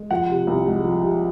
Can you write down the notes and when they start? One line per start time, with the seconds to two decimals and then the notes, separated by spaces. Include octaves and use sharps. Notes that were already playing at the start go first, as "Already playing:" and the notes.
Already playing: G#3
0.11 F3 F#5
0.30 C3
0.47 C2
0.66 G#3
0.84 F3
1.03 C3